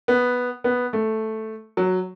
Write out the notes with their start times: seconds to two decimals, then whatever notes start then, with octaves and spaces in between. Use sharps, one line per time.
0.08 B3
0.64 B3
0.93 A3
1.77 F#3